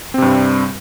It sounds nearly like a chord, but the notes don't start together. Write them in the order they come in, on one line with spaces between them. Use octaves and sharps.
C4 C3 G2 G3